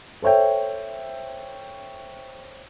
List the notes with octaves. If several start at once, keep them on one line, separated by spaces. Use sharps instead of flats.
A4 C5 C#5 E5 G5